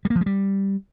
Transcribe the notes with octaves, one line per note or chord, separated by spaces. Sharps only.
G3
A#3
F3
G#3
G3